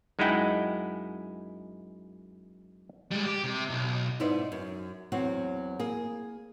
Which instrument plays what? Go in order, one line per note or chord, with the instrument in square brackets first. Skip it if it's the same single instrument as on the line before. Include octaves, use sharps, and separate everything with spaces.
[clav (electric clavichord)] F#2 G#3 D#4 E4 F#5 G5
[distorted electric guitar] G3 G#3
G4
C3
B1
[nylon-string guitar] G#2 B3 D#4 E4 C5 D5
F#2
E2 F#3 C4 F#4
A#3 G#4